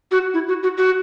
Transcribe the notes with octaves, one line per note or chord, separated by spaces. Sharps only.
F#4
E4
F#4
F#4
F#4